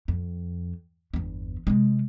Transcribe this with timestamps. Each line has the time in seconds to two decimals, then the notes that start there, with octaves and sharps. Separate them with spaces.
0.08 F2
1.14 G1 E2
1.67 C3 G#3